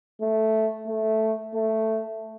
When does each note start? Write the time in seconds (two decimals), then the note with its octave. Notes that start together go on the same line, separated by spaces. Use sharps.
0.21 A3
0.87 A3
1.54 A3